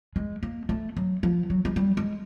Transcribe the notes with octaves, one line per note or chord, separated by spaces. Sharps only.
G#3
A#3
A3
F#3
F3
F#3
G#3
G3
G#3